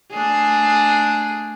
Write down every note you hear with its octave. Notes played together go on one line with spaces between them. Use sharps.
A3 D4 G#4